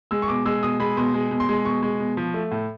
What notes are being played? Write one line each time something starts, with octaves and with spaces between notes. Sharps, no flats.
G#3 E6
C#6
B2 D6
G#3 E6
B2 D#6
G#3 B5
B2 C6
G#3
B2
C6
G#3
B2 C#6
G#3
B2
F3
A3
A2